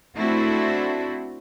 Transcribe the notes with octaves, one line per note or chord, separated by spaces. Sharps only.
A3 C4 D4 E4 F#4